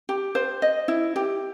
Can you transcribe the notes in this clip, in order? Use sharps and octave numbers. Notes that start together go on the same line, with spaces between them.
G4
C5
D#5
E4
G4